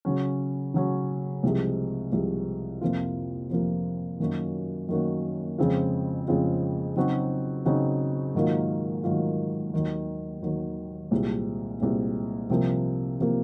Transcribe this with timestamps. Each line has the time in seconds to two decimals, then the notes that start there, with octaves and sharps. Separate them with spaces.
0.05 C#3 F#3 C#4
0.74 C#3 F#3 C#4
1.43 C2 C3 F3 G#3
2.12 C2 C3 F3 G#3
2.81 F2 C3 F3 A#3 F4
3.50 F2 C3 F3 A#3 F4
4.20 F#2 D#3 A#3 C#4 F#4
4.89 F#2 D#3 A#3 C#4 F#4
5.58 F2 C#3 G#3 C4 F4
6.28 F2 C#3 G#3 C4 F4
6.96 C#3 F#3 C4 D#4 F#4
7.65 C#3 F#3 C4 D#4 F#4
8.35 G#2 D#3 F#3 A#3 F4
9.04 G#2 D#3 F#3 A#3 F4
9.73 D#2 D#3 F#3
10.42 D#2 D#3 F#3
11.11 C2 A#2 G#3 C4
11.80 C2 A#2 G#3 C4
12.50 C2 C3 F3 A#3
13.20 C3 F3 A#3